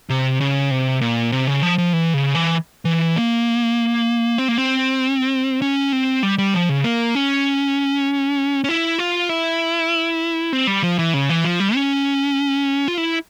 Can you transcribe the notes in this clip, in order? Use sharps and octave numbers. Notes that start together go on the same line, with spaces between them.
C3
C#3
C3
A#2
C3
C#3
F3
F3
E3
C#3
E3
E3
A#3
C4
A#3
C4
C#4
C4
G3
G3
F3
C#3
A#3
C#4
C#4
E4
F4
E4
C4
G3
F3
E3
C#3
E3
F3
G3
C#4
F4
E4